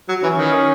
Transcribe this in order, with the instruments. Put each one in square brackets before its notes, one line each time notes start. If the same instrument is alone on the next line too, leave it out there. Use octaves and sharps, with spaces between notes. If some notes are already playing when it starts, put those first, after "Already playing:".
[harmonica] F#3
[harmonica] E3 [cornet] C#4
[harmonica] D#3